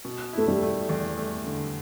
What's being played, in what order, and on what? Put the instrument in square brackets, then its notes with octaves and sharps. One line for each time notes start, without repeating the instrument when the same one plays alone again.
[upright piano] B2
[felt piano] A3 [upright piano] E4
[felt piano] G3
[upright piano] A3
E2
A3
D3